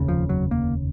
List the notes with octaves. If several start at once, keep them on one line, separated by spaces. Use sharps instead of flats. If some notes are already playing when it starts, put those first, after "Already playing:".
Already playing: F1 D#2 C#3
F3
F#3
A#3